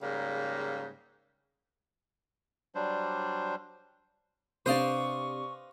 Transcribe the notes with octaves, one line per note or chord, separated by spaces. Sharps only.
G#2 C#3 G3 A#3
F#3 G3 D4 C5
C3 D4 B4 C5 D5 D#5 F5 C#6